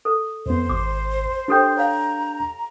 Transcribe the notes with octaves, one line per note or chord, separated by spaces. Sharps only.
A4
F2 B3 C5
G#1 D6
D4 G4 A4 G5 G6
C#5 F5 A#5